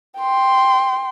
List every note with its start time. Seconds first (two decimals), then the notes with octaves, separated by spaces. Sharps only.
0.18 G5 C6